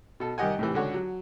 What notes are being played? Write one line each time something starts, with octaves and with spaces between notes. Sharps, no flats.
B2 A4
C2 D#3 G4 D#5 F#5 G#5
A2 C3 E3
C#2 D3 F#4 C#5
F#3